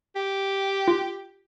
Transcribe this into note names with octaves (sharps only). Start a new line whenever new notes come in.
G4
F4